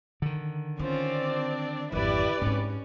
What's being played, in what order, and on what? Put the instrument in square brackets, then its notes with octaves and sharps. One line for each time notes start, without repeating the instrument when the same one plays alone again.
[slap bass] D3 D#3
[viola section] C4 D5 [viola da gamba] C#4 F4 C5 [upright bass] D#4
[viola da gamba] D4
[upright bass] G#1 F2 [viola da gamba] E4 [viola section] G4 B4 D5
[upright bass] G#2 C4 [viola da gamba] C#4